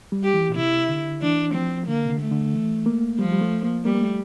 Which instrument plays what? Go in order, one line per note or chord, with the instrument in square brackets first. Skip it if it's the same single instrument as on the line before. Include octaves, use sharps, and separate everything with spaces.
[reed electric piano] G3
[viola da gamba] G4
[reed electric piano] E3
A#2
[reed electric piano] C3 [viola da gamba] E4
[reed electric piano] D3
[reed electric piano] E3 [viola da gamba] D4
[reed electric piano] F3 [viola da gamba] C4
[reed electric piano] D3 [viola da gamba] A#3
[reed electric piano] C3
D3
[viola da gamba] A3
[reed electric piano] D3
E3
A#3
[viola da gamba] F3 [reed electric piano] G3
[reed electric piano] G3
A3
A#3
[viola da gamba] G3 [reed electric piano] A#3
[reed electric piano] A#3
A3